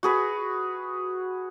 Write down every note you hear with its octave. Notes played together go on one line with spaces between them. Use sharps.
F#4 G#4 B4